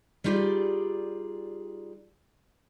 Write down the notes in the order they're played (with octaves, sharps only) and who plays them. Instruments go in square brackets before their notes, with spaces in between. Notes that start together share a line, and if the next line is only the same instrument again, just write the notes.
[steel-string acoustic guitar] G3 D#4 F4 G4 G#4 D5